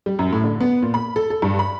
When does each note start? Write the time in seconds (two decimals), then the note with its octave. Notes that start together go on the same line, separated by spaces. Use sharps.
0.06 G3
0.19 F#2
0.33 A2
0.44 D3
0.61 B3
0.83 A#2
0.94 B5
1.16 A4
1.30 A4
1.42 G2
1.59 B5